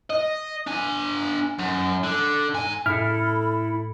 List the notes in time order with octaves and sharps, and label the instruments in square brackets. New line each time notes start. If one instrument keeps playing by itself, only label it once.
[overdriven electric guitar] D#5
D4 G#5
F#2
D3
G#2 G#5
[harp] A2 [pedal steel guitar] E4 A4 [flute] B5 [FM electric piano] F6